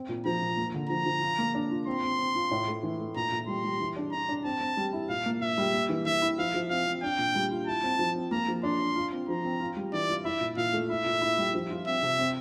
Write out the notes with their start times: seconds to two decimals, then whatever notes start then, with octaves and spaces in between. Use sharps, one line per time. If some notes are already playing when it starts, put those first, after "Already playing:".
Already playing: C4
0.09 A#2
0.26 F3 A#5
0.42 A#2
0.57 A#3
0.74 D3
0.89 F3 A#5
1.06 F3
1.22 F4
1.38 A#3
1.55 D4
1.71 F4
1.87 C4 C6
2.03 C4
2.19 C4
2.35 F4
2.51 A2
2.68 A3
2.83 E3
3.00 A3
3.16 A#2 A#5
3.32 A#2
3.48 G3 C6
3.64 G3
3.80 E3
3.96 D4
4.12 D4 A#5
4.29 D4
4.45 C4 A5
4.61 C4
4.77 G3
4.93 E4
5.09 A#2 F5
5.26 A#3
5.41 A#2 E5
5.58 G3
5.74 A#3
5.89 E3
6.05 E3 E5
6.22 E4
6.38 F3 F5
6.54 F3
6.70 C4 F5
6.86 C4
7.03 D4 G5
7.19 A#2
7.35 G3
7.51 F4
7.67 E4 A5
7.83 C4
7.99 F3
8.15 C4
8.31 A#3 A#5
8.48 F3
8.63 D4 C6
8.80 D4
8.96 F4
9.12 C4
9.28 F3 A#5
9.44 C4
9.60 F4
9.77 G3
9.93 E3 D5
10.09 F4
10.25 E4 E5
10.41 A#2
10.57 A#2 F5
10.73 A3
10.89 E4 E5
11.06 A#2
11.21 E4
11.38 G3
11.54 F3
11.71 F4
11.87 C4 E5
12.02 C3
12.19 C4